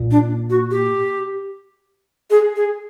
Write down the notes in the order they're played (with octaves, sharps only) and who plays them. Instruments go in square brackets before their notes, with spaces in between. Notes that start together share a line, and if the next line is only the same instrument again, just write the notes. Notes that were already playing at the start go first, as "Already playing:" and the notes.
Already playing: [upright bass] A#2
[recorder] D4
F#4
G4
G#4
G#4